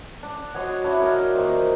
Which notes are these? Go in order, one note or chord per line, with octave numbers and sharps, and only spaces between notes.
D4
F#4 C#5 D#5 C6
D4 E4 C#5 D#5
A#4 D5 D#5
A#2 D#3 C5